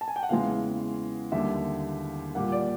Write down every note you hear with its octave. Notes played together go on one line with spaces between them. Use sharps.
A5
G#5
G5
F#5
E2 C#3 E3 G#3 F5
D#2 D3 G3 E5
A#2 G3 A#3 F#5
D5